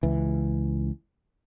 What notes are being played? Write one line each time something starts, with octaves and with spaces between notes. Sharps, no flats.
C#2 E3